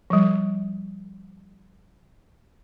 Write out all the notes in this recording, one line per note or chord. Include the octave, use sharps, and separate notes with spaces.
F3 G3